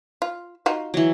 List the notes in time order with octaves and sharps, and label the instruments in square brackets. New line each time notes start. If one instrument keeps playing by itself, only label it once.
[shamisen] F4
D#4 F4 F#4
[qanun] E3 F#3